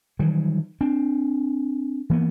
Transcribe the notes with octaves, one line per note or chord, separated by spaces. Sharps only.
D#3 E3 F#3 G3
C4 D4
E3 A#3 B3